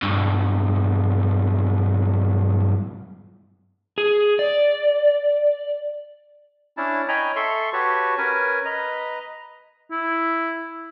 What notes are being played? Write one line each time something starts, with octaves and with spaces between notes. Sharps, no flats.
B1 G2
G#4
D5
C#4 D4 E4 A5
C#5 D#5 G5 G#5 A#5 B5
A4 E5 C6 C#6
F#4 G4 B4 C#5 A5 C#6
C#4 A#4 B4 G#5
B4 D#5 A#5
E4